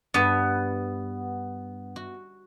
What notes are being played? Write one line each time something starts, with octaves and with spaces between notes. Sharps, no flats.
G2 B3 B4
F#4